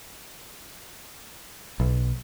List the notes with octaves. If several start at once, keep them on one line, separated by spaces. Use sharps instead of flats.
B1